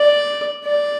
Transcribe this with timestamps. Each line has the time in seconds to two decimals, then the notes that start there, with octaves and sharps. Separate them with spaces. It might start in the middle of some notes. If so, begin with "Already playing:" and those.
Already playing: D5
0.65 D5